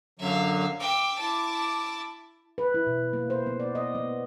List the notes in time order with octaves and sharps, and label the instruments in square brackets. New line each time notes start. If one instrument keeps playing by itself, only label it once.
[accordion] F#2 D3 F#3 [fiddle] E5 F5
[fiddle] E5 G5 [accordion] D6
[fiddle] E4 A5
[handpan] B4
E4
B2
A#3
C5
B3
D5
D#5
B3